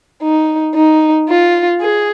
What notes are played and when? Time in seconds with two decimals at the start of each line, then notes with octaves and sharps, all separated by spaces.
0.22 D#4
0.75 D#4
1.29 F4
1.81 G#4